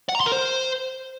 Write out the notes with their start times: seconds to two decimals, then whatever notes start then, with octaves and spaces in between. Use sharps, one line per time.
0.09 F#5
0.15 A#5
0.20 C6
0.26 A#4
0.32 C5